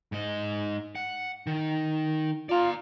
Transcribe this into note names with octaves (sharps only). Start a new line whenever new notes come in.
G#2 D#5
F#5
D#3
F4 D5 A#5